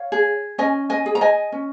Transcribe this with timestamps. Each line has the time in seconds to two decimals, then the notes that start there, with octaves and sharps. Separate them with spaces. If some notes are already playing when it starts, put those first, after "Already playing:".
Already playing: C#5 F5
0.12 G#4
0.58 C#4 D#5 G#5
0.90 D#5 G#5
1.06 G#4
1.15 A#5
1.21 D#5 G#5
1.52 C#4